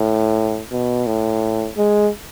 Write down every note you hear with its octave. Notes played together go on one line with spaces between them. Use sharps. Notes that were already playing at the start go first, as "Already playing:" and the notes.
Already playing: A2
B2
A2
G#3